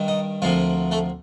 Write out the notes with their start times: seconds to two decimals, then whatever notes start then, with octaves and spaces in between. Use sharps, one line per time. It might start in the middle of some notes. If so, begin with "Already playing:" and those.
Already playing: G2 D#3 G3
0.08 D#4
0.42 D2 C3 F3 A#3 F4
0.91 A3 A4